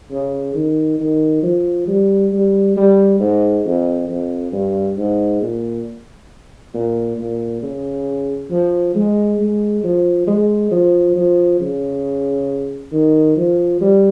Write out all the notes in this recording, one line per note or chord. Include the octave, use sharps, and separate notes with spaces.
C#3
D#3
D#3
F3
G3
G3
G3
G#2
F2
F2
G2
G#2
A#2
A#2
A#2
C#3
F3
G#3
G#3
F3
G#3
F3
F3
C#3
D#3
F3
G3